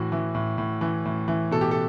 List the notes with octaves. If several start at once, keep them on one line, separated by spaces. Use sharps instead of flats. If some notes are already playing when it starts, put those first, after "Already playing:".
Already playing: A2 E3 F#4
E3
A2
A2
E3
A2
E3
B2 A4
G4
A4